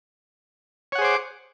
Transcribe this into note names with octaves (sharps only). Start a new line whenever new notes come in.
G#4 C5 C#5 F#5 D6